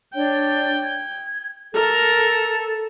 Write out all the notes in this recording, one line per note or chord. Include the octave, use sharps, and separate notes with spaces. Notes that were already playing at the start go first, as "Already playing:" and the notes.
D4 C#5 G5
G#6
A4 A#4